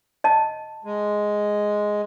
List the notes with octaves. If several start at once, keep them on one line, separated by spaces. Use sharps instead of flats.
D#5 A5
G#3